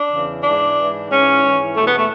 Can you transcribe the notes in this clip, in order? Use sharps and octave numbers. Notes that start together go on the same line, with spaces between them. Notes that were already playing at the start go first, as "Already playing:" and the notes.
Already playing: D4
E2 C#3 E3
G#2 E3 D4
G#2 E3
G#2 E3 C#4
G#2 E3
E2 B2 A3
B3
A3